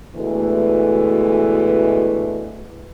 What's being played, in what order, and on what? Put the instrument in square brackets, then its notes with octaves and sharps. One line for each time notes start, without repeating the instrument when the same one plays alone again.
[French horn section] D2 B2 E3 G#3 A3